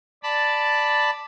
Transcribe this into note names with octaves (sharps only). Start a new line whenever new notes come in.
D5 A5 B5